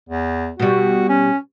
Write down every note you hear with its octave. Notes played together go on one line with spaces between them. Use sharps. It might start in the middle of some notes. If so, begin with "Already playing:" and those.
E2
B2 G3 F#4
C#4